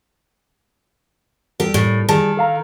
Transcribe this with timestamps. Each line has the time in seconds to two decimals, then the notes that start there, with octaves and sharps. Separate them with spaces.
1.60 G3 G4 A4 A#4
1.74 A2
2.09 D#3 G3 G#4 A5
2.37 A4 F5 A#5